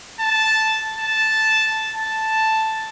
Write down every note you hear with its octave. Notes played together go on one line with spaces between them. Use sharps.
A5
A5
A5